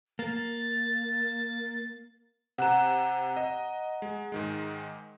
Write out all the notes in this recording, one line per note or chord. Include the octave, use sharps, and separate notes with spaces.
A#3 A6
C3 F#5 A#5 F#6 E7
D#5
G#3
G#2 D#3 G#3